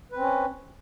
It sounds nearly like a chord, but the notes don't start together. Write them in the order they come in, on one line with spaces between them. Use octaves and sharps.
B4 C4 C#4